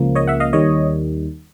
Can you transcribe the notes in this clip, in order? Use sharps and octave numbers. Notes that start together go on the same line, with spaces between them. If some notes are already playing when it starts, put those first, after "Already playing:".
Already playing: C#2 C#3 F3 A#3
C#5 D#5
E5 F#5
D#5 F5
D#2 D#3 G3 C#5 D#5